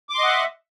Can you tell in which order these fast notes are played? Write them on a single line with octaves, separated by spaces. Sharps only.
D6 C6 D#5 F#5 E5